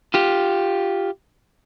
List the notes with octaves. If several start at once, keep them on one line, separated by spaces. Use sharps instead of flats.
F4 G4